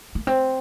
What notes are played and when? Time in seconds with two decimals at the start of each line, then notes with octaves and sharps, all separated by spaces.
0.15 A#3
0.27 C4